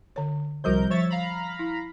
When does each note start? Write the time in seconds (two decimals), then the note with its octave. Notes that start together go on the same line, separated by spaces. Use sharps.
0.16 D3 C#5
0.64 C2 F3 G3 F#4 A#4 G6
0.91 F3 C#5 E5 A6
1.10 F5 A#5 B5
1.59 E4